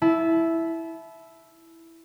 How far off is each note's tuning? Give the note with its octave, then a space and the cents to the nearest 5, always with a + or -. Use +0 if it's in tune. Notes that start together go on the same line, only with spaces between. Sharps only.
E4 +0 A5 -30